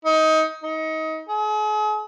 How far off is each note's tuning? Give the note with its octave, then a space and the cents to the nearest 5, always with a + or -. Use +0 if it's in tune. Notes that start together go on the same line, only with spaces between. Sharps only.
D#4 +20
D#4 +25
G#4 +40